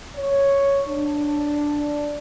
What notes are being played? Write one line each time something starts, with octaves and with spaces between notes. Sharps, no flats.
C#5
D4